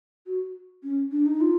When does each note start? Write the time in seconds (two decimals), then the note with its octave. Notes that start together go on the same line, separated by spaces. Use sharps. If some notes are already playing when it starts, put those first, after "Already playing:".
0.27 F#4
0.83 C#4
1.11 D4
1.26 D#4
1.41 F4